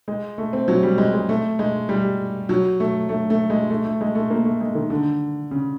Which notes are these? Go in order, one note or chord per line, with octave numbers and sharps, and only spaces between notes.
G#3
A3
C4
F#3
G3
G#3
G#3
A3
G#3
G3
F#3
A3
A3
A3
G#3
A3
A3
G#3
A3
A#3
A3
G#3
D#3
D3
C#3